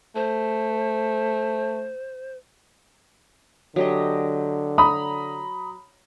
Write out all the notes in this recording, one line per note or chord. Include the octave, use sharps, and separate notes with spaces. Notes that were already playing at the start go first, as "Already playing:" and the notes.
A3 C5
D3 F#3 G4 D#5
A#5 B5 D#6